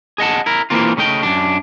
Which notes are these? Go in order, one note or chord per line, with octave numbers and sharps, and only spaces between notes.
G#4 D#5 F#5 A5
E4 A#4
E3 F3 A#3 C4 F4
C#3 A3 D#5 G5
F#2 D4